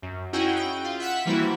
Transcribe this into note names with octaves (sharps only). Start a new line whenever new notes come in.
F#2
C#4 D#4 E4 F#4 G#4 G5
G5
F4
E5 F#5 B6
E3 G3 A#3 C4 E4 F#4